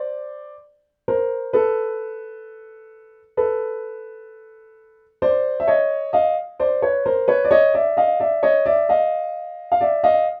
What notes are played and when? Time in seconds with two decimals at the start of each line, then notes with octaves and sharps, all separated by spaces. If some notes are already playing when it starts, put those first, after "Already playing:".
Already playing: C5 D5
1.08 A#4 C5
1.53 A4 B4
3.37 A4 B4
5.22 C5 D5
5.60 E5
5.68 C#5 D#5
6.13 D#5 F5
6.59 C5 D5
6.82 B4 C#5
7.06 A#4 C5
7.28 B4 C#5
7.44 D5
7.51 C#5 D#5
7.74 D5 E5
7.97 D#5 F5
8.20 D5 E5
8.43 C#5 D#5
8.66 D5 E5
8.89 D#5 F5
9.72 F5
9.81 D5 E5
10.04 D#5 F5